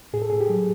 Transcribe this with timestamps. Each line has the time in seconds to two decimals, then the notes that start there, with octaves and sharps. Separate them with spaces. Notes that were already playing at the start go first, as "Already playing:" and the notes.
0.13 A2 G#4
0.22 A4
0.30 A2 G#4
0.41 G4
0.50 F#3